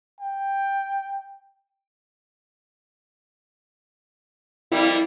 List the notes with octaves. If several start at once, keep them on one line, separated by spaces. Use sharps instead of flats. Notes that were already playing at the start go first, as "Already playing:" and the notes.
G5
F2 G3 A#3 E4